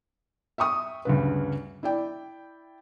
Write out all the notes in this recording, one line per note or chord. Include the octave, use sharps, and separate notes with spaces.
E5 G5 C#6 D#6
D2 G2 C#3 B4
E4 D5 G5